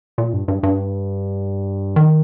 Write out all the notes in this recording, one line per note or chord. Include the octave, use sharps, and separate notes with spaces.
A#2
G2
G2
G2
D#3